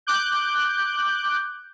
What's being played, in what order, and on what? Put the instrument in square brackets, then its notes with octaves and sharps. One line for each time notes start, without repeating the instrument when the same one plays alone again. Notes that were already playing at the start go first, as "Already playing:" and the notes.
[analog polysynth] D6 F#6 G6